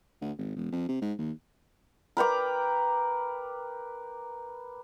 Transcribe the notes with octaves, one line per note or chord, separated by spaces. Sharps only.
D2
G#1
E1
F2
C3
G#2
D#2
A#4 B4 G5 D6